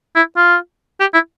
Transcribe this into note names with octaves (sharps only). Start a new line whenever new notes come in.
E4
F4
G4
E4